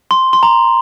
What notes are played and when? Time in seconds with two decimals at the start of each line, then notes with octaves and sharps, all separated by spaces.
0.11 C6
0.33 C6
0.43 A#5